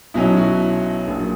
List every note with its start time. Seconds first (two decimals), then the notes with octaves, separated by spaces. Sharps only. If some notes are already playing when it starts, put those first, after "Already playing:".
0.14 B1 B2 F#3 C#4 E4
0.33 E4
0.37 F#4
1.08 A#1 A#2 F#3